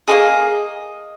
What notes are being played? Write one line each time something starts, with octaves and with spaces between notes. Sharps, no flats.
A#3 F4 G#4 D#5